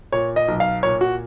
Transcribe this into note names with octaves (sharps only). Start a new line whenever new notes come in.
A#2 C#5
D#5
B1
F5
A#2 C#5
F#4